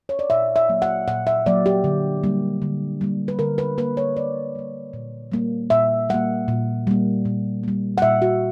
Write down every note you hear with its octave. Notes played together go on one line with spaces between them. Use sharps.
C#5
D5
A#2 E5
E5
F#3 A#3
F#5
A#2 F#5
E5
F#3 A#3 D5
G4
D3
G3 A#3
D3
G3 A#3
B4
D3 A#4
B4
G3 A#3 B4
C#5
D3 D5
G3 A#3
A#2
G3 A#3
A#2 E5
G3 A#3 F#5
A#2
G3 A#3
A#2
G3 A#3
F#5
A#2 E5
F#4